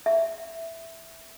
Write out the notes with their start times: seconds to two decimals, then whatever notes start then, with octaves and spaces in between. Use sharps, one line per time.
0.06 E5